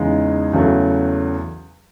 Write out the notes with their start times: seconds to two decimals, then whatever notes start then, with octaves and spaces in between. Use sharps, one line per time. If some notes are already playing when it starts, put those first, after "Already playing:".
Already playing: E2 C#3 G#3 D#4
0.53 E2 C#3 F#3 A3